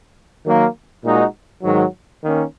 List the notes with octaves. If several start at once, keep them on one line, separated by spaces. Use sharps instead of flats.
D#3 F#3 A#3
A#2 G#3 D#4 F#4
G#2 D#3 F#3
D#3 A#3 C#4